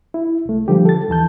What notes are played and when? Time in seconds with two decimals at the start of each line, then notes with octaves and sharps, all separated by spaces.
0.14 E4
0.45 C2 A3
0.68 D3 F3 G3 G4
0.85 A4 A6
1.09 D#2 E3 A5 G6